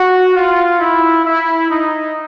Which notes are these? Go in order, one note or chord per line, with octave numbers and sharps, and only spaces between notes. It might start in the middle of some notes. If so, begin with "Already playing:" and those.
Already playing: F#4
F4
E4
E4
D#4